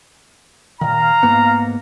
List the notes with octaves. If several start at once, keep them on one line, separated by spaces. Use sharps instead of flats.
A#2 D#3 F5 A#5
G#2 A#3 B3